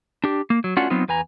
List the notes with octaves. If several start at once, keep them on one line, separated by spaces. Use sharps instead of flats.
D4 G4
A#3
F#3
A3 C#4 D4 F4 F#4 F#5
F#3 B3 C4 D#4 F4
E2 B4 G#5 A#5